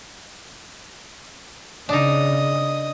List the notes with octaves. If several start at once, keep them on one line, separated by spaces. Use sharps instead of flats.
C#3 D4 D#4 D#5 D#6